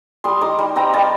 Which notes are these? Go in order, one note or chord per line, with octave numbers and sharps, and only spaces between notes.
G3 C6 D#6
D#4 A#5 D6
G3
C4 G5 A#5
G3 F5 A5